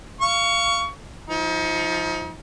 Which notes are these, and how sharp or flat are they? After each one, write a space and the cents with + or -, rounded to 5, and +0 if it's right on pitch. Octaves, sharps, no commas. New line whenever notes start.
F5 -15 C#6 +20
F3 +0 D#4 +35